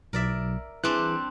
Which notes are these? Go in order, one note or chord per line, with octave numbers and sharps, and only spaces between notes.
B1 A#4 D5 E5
E3 G3 C4 D4 G#4 D6 F#6